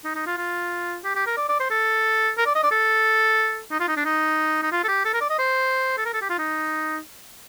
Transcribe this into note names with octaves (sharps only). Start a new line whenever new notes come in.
D#4
D#4
F4
F4
G4
G4
A#4
D5
D5
C5
A4
A#4
D5
D#5
D5
A4
D#4
F4
D#4
D4
D#4
D#4
F4
A4
G4
A4
A#4
D5
D#5
C5
A4
A#4
A4
G4
F4
D#4